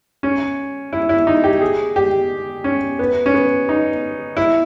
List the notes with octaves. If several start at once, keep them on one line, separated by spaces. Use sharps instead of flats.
C#4
E4
E4
D#4
G4
G#4
G4
C#4
B3
C#4
B3
D#4
E4